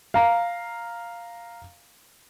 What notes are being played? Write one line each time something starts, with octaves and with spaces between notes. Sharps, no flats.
F5 A#5